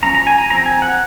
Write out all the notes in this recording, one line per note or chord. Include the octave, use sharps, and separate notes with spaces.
F3 A#3 C#4 A#5
A#5
G#5
A#5
F3 C4 A#5
G#5
F#5